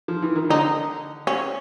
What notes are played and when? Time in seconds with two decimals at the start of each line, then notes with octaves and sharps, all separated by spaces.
0.08 F3
0.22 E3
0.36 D#3
0.49 D3 D#4
1.27 C#4